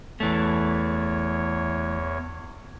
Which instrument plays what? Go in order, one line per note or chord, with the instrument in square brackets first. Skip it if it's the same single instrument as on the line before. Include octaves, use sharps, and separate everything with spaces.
[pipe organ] E2 C#5 [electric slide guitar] E3 A3